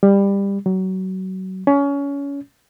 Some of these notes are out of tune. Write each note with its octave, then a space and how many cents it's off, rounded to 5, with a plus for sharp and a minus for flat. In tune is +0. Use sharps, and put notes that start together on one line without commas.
G3 +20
F#3 +25
C#4 +25